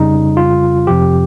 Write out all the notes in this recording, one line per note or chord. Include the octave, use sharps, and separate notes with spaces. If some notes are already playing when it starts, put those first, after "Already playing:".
Already playing: F2 C#3 G3 D#4
F4
F2 C3 F3 G4